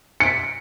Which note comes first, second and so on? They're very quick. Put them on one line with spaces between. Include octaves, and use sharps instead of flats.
C#7 D7 B6